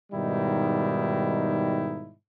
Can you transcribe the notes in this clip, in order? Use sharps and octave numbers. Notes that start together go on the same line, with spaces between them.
G#2 B2 D#3 G3 D#4 E4